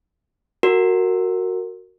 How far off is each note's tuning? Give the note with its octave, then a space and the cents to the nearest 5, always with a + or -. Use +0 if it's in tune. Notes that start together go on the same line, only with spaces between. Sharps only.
F#4 +0 A#4 -20